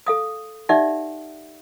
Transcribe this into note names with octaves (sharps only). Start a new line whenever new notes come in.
A4 F5 D#6
D#4 G4 D5 E5 F#5